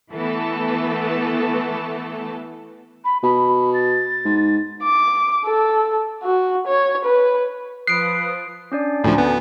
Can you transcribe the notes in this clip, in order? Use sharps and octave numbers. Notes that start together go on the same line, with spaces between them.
E3 A3 B3 A4
B5
B2 B5
A6
G#2
D6
A4
F#4
C#5
B4
F3 B4 D#6 F#6 C7 D7
C#4 D4 D5
D2 A2 F3
B3